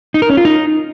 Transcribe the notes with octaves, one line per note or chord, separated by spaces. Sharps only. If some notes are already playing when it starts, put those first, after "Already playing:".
D#4
A#4
C#4
F4
D#4